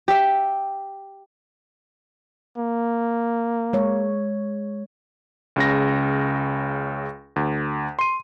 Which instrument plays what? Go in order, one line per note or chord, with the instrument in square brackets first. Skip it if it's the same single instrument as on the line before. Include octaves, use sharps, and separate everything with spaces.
[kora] G4 E5
[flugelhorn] A#3
[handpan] G#3 C#5
[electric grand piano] C#2 C#3 A#6
D2
C6 D#7